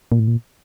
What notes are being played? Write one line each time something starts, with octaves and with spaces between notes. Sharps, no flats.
A#2
A2
A#2